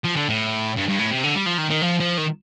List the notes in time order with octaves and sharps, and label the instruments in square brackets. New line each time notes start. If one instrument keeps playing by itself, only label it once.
[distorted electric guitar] F3
D3
A2
G2
G2
A2
C3
D3
G3
F3
D#3
D#3
F3
F3
D#3